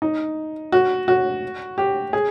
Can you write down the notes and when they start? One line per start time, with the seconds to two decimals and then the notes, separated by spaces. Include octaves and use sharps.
0.02 D#4
0.72 F#4
1.08 F#4
1.78 G4
2.13 G#4